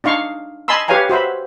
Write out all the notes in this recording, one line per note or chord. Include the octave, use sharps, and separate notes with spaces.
D4 D#4 F5 C#6
D#5 G#5 A5 B5 C6 E6
G4 B4 C#5 F5 G#5 A#5
F#4 C5 E5 B5